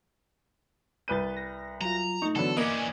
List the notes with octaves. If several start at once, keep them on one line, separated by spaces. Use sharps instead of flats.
C2 B4 G6 A6 D#7
A#6
F#3 F4 A#5
A3 D#4 C#6
D3 E3 F#3 B3 A4
E3 A#3 C#4 D5 D#5 D6